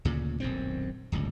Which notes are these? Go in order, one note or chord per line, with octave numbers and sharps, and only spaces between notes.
D2 A#2 C#3
D#1 B1 F#2 C4
D1 G1 C#2